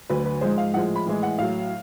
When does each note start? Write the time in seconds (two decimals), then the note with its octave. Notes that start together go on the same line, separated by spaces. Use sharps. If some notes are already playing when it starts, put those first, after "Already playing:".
0.10 D2 D3 F#3 B4
0.26 B4
0.41 G#2 F3 G#3 C5
0.58 F5
0.74 A2 F3 G#3 F#5
0.96 B5
1.06 A2 E3 G#3
1.23 F#5
1.38 A2 F#3 F5